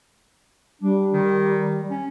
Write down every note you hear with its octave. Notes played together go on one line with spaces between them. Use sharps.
G3 D4
D#3
C#4